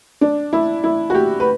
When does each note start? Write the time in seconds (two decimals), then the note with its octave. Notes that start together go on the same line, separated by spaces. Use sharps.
0.21 D4
0.53 E4
0.84 E4
1.10 F#4
1.15 G4
1.40 B4